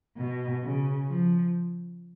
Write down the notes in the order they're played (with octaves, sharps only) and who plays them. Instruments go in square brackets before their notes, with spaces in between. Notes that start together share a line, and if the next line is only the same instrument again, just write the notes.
[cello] B2
C#3
F3